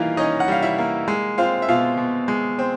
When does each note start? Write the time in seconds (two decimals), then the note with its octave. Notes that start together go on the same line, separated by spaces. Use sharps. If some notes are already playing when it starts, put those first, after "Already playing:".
Already playing: E3 G3 A#3 D#4 F4 F5
0.17 C#4 D#4 D#5
0.40 F#5
0.48 G3 F5
0.62 E4 E5
0.78 A#3
1.08 G#3
1.38 C4 F4 F5
1.62 E5
1.68 B2 F4 F5
1.97 B2
2.28 G#3
2.59 C4